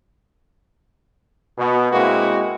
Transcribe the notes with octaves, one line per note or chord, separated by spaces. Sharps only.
B2
B2 G#3 A#3 C4 E4 F#4